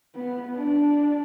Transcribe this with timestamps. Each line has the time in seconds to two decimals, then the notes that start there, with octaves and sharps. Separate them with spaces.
0.15 B3
0.56 D4